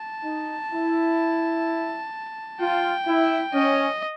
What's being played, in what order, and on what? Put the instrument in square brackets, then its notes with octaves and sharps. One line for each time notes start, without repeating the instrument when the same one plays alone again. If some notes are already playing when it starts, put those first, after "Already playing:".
Already playing: [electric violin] A5
[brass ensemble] D#4
E4
[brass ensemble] F4 [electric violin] G5
[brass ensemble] E4
[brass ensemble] C#4 [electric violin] D#5